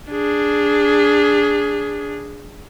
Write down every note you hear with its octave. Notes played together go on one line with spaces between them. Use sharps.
D4 G#4